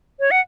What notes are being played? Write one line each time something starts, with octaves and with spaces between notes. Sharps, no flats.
C#5
F#5